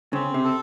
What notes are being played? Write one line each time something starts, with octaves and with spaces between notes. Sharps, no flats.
C#3 C4
C3
A4